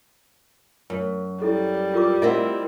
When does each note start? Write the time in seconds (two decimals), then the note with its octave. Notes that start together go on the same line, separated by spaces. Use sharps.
0.90 F#2
1.42 G3 E4 A4
1.94 F4 A#4 D6
2.22 C4 E4 A#4 D#5 F#5